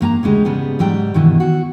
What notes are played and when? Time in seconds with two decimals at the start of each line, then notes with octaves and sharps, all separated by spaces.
0.01 G2 A#3 G#5 A#5
0.23 D2 C#3 G#3 G4
0.45 G#2 C#3 G3 B3
0.79 G#2 F#3 G3 G5
1.14 G2 B2 D#3 E3
1.40 F#4